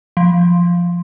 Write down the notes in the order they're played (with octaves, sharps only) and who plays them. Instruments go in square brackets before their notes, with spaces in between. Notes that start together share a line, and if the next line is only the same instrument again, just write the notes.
[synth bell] F3